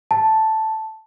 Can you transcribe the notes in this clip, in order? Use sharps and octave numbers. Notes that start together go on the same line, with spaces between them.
A5